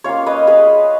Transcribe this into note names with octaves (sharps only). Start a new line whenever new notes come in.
A#3 C#4 F4 C#5 F5
B4 D#5
G#4 B4